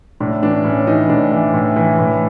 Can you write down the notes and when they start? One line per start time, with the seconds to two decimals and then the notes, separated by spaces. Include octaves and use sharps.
0.20 A2 D4
0.42 E3 D4
0.65 A2 C#4
0.87 E3 D#4
1.09 A2 D4
1.32 E3
1.54 A2
1.76 E3
1.99 A2